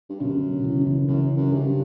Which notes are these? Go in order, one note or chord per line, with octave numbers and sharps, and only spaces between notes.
G2
F#2 B2 D3
C#3 E3
D3
C#3 E3
F#2 C#3 E3
F#2
G2 C#3